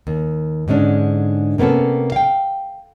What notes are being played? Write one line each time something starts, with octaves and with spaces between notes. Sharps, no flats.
D#2
G#2 D3 G#3 C#4 D4
C3 A#3 B3 C#4 A4
F5 G5